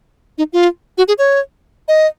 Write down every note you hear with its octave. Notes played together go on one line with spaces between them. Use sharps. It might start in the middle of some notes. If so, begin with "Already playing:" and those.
D#4
F4
F#4
G#4
C#5
D#5